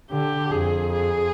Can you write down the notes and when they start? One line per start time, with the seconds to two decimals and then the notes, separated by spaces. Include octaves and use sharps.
0.11 D3 G4
0.52 F2 G#4
0.93 G#4